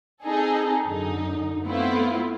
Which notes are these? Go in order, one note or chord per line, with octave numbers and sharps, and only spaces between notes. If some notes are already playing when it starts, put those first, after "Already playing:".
C4 D#4 G#4 A4
F#2 D3 D#4
A3 B3 C4 E4 F4